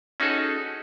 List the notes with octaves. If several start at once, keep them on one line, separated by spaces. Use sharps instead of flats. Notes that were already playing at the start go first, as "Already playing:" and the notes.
C#4 D#4 F#4 G#4 A4